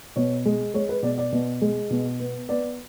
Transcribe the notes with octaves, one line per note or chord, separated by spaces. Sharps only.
B2 C#5
G#3
G#3 C#5
B4
B2 D5
D5
B2
G#3
B2
B3
B3 D5